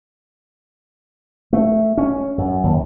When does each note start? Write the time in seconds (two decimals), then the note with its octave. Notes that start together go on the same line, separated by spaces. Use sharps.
1.53 A3
1.98 C#4
2.38 F#2
2.64 D#2